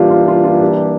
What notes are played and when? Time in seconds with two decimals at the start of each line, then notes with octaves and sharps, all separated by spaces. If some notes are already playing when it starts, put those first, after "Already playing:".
Already playing: E3 G3 A#3 D4 F4 G4
0.10 F4
0.28 F4
0.44 F4
0.61 G4